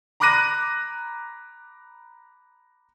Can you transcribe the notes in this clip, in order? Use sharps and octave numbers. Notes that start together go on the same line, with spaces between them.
A#5 B5 D6 F#6 A#6 D#7